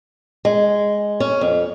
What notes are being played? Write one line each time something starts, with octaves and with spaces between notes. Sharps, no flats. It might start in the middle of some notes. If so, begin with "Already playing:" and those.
G#3
C#4
F2